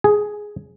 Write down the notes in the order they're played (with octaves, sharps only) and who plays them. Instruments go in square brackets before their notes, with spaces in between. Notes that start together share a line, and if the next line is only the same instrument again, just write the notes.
[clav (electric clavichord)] G#4